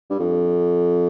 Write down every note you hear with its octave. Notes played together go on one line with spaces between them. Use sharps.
G2
F2